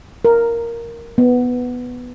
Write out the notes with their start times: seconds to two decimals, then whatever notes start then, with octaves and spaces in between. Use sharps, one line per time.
0.25 A#4
1.18 B3